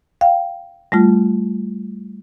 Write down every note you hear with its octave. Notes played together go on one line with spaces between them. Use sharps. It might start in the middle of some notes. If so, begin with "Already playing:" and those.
F5 G5
G3 A3 F4